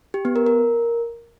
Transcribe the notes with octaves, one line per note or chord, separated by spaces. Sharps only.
G4
B3
A#4
A#4